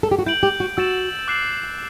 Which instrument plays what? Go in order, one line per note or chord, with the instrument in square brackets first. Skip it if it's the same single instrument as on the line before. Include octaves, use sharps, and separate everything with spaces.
[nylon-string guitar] A4
G4
F#4
[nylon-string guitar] E4 [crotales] G6 D7 F#7
[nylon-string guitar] G4
F#4
[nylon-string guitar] F#4 [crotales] E6 A6 E7
[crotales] D6 F#6 C7 F#7